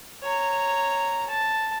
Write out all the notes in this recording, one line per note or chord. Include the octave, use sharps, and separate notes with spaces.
C#5 A#5
A5